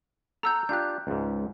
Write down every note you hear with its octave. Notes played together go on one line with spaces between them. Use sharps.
A4 F#5 A#5 E6 G6
D4 F4 G4 F#6 G6
C#2 G#2